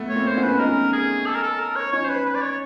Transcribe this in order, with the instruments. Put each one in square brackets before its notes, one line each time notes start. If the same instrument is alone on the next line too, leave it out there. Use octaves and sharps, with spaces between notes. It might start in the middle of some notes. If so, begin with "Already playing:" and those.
Already playing: [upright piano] A3 B3
[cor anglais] C#5
[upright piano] A#3 C4
[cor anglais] C5
[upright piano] C4
B3 C#4
[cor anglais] B4
[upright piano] C#4 D#4 [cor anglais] A#4
[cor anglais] G#4
A4
A#4
A4
A#4
C#5
[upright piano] C#4 D#4 [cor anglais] C#5
[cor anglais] C5
B4
B4
D5
C#5